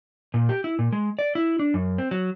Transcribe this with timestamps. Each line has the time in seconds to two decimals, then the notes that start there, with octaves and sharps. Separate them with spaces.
0.34 A#2
0.49 G4
0.64 E4
0.79 A#2
0.93 G#3
1.19 D5
1.35 E4
1.59 D4
1.74 F#2
1.98 C4
2.11 F#3